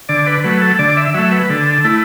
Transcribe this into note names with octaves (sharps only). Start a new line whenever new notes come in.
D3 D5
B4
F#3 A3 B4
A4
D3 D5
E5
F#3 A3 E5
B4
D3 A4
A3 E4